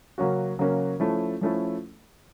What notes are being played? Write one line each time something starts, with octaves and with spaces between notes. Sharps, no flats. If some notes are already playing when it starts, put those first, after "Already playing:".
C#3 F#3 A#3 C#4 F#4
C#3 F#3 A#3 C#4 F#4
F3 A3 C#4 E4 A4
F3 A3 C#4 E4 A4